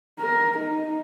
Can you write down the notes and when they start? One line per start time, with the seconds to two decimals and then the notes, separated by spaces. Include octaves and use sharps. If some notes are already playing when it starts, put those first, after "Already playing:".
0.20 A#4
0.59 D#4